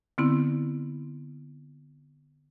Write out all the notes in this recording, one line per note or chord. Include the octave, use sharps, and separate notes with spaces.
D3 B3 C4 E4